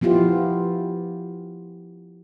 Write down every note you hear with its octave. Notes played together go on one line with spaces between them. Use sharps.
F3 B3 E4 F4 G4